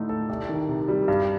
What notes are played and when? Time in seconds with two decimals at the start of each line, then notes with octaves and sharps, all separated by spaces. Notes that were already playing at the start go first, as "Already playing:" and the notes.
Already playing: A2 D3 A3 D#4
0.09 A4
0.29 C2
0.49 D#3
0.68 C3
0.88 G3
1.08 G2